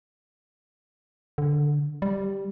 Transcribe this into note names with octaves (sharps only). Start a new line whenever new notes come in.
D3
G3